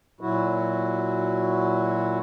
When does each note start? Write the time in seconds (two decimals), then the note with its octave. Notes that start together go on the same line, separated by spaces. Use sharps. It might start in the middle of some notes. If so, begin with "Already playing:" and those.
0.21 A#2 F#3 E4 F#4